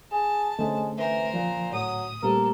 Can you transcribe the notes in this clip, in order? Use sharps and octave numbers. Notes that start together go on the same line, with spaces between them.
G#4 A5
D3 G#3 A3 C4 C#4
E3 A#4 C5
A#2 F3
A2 F#3 D#6
A#2 G3 A3 C4 G4 A4 A#4